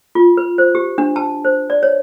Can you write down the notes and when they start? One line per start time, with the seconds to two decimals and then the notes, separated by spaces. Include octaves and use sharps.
0.15 F4
0.37 B4
0.58 C5
0.75 G4
0.98 D4
1.16 A5
1.45 C5
1.70 D5
1.83 C#5